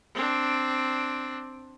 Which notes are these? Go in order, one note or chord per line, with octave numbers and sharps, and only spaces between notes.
C4 D4